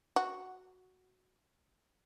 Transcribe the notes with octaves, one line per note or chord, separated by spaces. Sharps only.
F#4